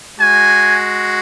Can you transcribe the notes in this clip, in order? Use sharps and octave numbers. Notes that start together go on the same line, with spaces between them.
G#3 F#4 G#5